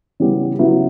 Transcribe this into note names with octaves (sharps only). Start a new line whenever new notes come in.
C#3 E3 G3 B3
C#3 F#3 B3 E4